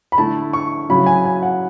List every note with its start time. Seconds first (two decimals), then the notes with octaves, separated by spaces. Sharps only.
0.12 B5
0.18 D3 A3 E4 A5
0.53 C#6
0.90 C#3 F#3 C#4 E4 B5
1.06 G#5
1.25 G#5
1.43 F#5